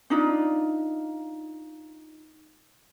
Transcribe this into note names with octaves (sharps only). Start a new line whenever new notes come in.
D4 D#4 F4